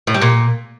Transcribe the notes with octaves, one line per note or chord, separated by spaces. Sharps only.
A2
G3
A#2